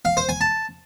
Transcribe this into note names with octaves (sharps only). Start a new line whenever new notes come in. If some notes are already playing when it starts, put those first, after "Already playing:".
F5
C5
G#5
A5